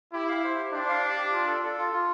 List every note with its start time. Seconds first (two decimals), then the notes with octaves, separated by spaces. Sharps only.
0.13 E4 G4
0.28 F5
0.44 C5
0.58 G4
0.73 D4 C5
0.89 F5
1.03 G4
1.18 G4
1.33 F4
1.47 A4
1.63 A4
1.78 F4
1.93 F4